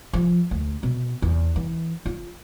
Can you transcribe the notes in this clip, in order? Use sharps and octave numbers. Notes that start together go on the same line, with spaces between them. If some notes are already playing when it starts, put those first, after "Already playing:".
F3
D2
B2
E2
E3
F4